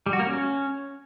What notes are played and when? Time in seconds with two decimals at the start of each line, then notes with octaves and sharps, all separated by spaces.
0.06 G3
0.13 F#4
0.19 A#3
0.26 C#4